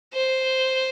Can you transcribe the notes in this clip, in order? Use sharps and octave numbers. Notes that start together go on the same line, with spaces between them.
C5